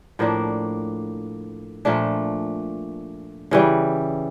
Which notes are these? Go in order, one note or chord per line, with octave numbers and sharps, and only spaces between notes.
A2 F3 A#3 D4
A#2 F3 A3 D4
C#3 E3 G3